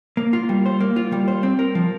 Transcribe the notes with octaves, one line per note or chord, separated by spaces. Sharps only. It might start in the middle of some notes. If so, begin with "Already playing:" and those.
A#3
F4
G3
C5
A#3
F4
G3
C5
C4
A#4
F3